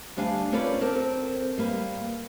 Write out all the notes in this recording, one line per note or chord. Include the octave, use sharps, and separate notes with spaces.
D2 G3 D4 F5 G#5
C4 C#4 F4 A#4 B4 D5
C4 A4 A#4
G3 A#3 B4